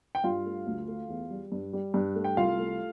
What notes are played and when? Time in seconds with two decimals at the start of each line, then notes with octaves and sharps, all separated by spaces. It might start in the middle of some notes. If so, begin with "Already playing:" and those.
0.15 G5
0.24 G2 F4 F5
0.46 A3
0.66 D2
0.88 A3
1.09 E2
1.30 G3
1.52 G2
1.73 G3
1.94 G2
2.15 A3
2.24 G5
2.37 C2 F4 F5
2.58 A3